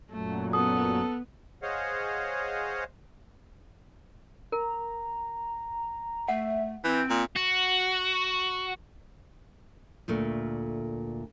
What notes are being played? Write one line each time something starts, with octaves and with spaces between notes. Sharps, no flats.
F#2 A#2 F#3 A3
B3 A4 D#6
G#4 C5 C#5 D#5 F5 F#5
A#4 A#5
A3 E5 F#5
E3 C4 G6
A#2
F#4
D2 A#2 A3